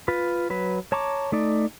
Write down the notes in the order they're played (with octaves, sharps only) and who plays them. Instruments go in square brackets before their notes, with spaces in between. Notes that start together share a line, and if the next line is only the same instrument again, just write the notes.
[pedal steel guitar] F4 B4
F#3 B4
C#5 A5 A#5 C#6 D6
A3 D#4 D5